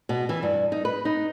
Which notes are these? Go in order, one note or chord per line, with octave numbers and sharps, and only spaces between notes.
B2
E3
G2
D#4
B4
D#4